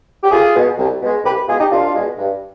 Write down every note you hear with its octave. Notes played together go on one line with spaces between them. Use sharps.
G4
C2 F4 G#4
B2 G#3
C2
B2 G#3
C2 G4 B4
B2 G#3 F4 G#4
D#4 G4
C2 D4 F4
B2 G#3
G2